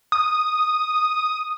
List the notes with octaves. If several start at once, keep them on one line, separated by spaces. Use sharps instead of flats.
D#6